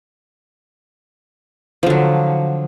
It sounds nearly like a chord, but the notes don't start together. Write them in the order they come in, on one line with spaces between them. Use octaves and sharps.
F3 D3 F#3